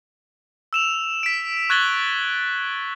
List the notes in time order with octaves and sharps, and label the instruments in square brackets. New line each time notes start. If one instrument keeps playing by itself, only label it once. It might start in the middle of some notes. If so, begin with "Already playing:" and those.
[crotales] E6 E7 F7
B6 D7
C#6 F#6 G#6 A6 F#7 G7